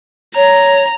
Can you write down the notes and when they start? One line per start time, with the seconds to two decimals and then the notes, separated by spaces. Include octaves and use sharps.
0.35 C#5 A#5